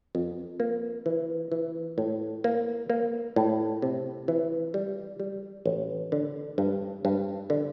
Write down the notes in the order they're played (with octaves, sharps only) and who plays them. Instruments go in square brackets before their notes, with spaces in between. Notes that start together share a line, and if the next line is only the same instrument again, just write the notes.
[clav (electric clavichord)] F2
A#3
E3
E3
A2
A#3
A#3
A2
C3
E3
G3
G3
A1
D3
G2
G2
D3